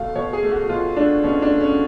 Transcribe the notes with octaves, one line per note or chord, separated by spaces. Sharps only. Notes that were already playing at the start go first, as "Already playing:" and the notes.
Already playing: B2 A3 F5
B2 C#5
G#4
A3
F#4
B2 F4
A3 D4
B2 C#4
D4
A3
C#4